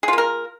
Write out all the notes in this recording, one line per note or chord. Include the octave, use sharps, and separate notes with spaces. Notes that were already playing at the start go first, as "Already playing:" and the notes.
A#3 F4 G#4 A#4